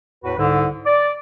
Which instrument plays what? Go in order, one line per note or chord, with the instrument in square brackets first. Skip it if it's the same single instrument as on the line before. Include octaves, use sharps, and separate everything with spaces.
[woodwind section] E2 A2 F#4 B4
C2 G#2 D3
D5